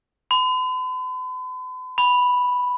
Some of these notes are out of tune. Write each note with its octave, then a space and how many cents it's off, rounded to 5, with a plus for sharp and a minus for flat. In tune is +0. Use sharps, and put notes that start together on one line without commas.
B5 +45
B5 +0